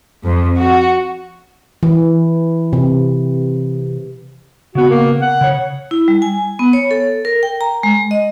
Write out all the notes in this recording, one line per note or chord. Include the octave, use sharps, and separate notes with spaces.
F2
F#4
E3
C3
C#3 B3 F#4
A#3
F#5
C#3 C#5
E4
G3
G#5
B3
C#5
A4
A#4
G5
A#5
G#3
D#5